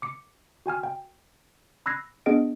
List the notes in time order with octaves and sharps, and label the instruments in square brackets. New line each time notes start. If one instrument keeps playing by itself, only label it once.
[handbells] D6 C#7
F#4 G5 G#5 F6
G5
B5 E6 F#6 G#6 A#6 C7
B3 D4 G#4 D#5 F#5 D7